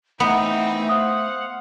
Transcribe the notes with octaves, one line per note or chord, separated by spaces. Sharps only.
E3 A3 B3 C4 D#4
C5 F5 F#5 D#6